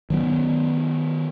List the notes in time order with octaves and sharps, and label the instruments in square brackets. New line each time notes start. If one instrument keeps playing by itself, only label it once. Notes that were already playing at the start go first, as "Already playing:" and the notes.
[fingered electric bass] D#3 F#3 B3